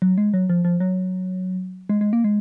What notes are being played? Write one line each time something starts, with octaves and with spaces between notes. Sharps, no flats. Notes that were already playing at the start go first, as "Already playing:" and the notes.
F#3
G#3
F#3
F3
F3
F#3
G#3
G#3
A#3
G#3